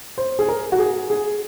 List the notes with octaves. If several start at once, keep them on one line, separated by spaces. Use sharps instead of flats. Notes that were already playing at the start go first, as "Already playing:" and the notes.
C5
G#4
A#4
F#4
G#4
G#4